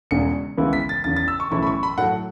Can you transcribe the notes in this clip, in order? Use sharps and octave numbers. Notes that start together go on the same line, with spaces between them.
E1 E2 C#3 C#7
C#2 C#3 E3 B3 E4
B6
A6
E2 C#3 E3 A6
A6
E6
C#6
B1 A2 E3 C#4 E4 C#6
B5
C#6
B5
A2 F#3 A3 F#5